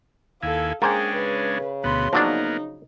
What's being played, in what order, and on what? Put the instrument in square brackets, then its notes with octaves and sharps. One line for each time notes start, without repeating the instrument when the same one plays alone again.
[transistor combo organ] D#2 E4 G#5 [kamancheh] A4 F5
[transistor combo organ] G#3 C#4 D4 [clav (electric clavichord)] A#3 C5 G#5 [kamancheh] G#4 G5
[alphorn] C#3 [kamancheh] B4
[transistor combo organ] D2 B2 B3 [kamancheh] B5 C6
[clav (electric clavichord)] F3 F#3 D4 [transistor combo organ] A#3 B3 [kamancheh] D#4